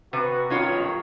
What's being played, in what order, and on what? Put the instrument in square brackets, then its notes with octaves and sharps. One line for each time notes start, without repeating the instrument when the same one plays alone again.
[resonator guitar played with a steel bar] C3 [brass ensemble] F#4 B4
[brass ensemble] B1 G2 D#3 [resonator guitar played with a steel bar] C#4 F4 C#5